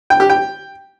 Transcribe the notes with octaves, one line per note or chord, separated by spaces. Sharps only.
G5
G4
G5